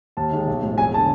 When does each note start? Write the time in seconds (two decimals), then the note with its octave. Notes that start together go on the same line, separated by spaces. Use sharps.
0.17 D#2 A5
0.32 D#3 G#3
0.47 B1
0.63 A2 F3 G#3
0.78 E1 G#5
0.94 A5
0.97 D3